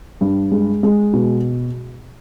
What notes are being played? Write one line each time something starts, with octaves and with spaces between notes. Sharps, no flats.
G2
G#3
G#3
B2